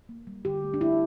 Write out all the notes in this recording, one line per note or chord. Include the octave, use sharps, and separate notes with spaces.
A#3
G3
D3 G4
A3
D4
A3 E4